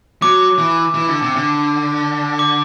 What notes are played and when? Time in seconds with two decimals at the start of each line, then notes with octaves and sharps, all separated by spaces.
0.22 F#3 D6
0.58 E3
0.95 E3
1.08 D3
1.22 C3
1.36 D3
2.39 D6